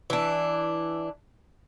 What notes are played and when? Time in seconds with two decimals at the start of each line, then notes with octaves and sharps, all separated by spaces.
0.10 E3 D4